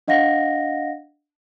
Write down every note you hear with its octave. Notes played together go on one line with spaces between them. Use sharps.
D4 D#5 F5 F#5 A#6